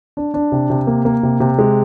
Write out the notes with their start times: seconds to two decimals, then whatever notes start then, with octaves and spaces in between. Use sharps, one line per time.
0.17 D4
0.34 D4
0.52 C3
0.70 C3
0.87 A#3
1.05 A#3
1.23 C3
1.40 C3
1.59 G#3